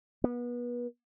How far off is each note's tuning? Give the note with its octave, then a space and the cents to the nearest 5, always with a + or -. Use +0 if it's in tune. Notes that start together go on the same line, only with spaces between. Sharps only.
B3 -30